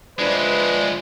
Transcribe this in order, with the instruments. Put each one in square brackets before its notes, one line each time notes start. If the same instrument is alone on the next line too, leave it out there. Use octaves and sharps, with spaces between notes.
[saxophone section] F3 D4 [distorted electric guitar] G#3 E4 [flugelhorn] B4